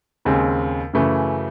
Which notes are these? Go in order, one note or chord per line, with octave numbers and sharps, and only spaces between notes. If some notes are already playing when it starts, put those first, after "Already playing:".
D#2 C#3 G#3 C4
F#2 C#3 E3 A3